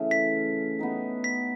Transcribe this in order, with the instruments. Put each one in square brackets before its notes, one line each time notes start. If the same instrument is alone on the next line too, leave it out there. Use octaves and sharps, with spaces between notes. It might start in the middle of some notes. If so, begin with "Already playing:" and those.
Already playing: [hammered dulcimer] C#3 E3 A3 C#4
[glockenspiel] B6
[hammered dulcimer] B3 D#4 G4
[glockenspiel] B6